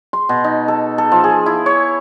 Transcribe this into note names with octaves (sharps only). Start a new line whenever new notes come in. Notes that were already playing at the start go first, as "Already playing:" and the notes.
C6
B2
D#4
A4
A4
F3
G#4
E4
C#5